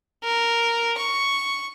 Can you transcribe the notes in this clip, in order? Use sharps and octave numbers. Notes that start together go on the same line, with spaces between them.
A#4
C#6